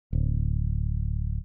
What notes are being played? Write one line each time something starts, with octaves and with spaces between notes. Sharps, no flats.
D1